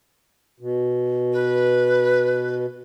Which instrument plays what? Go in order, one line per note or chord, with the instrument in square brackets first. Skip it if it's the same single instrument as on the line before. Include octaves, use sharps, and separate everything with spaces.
[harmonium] B2
[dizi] B4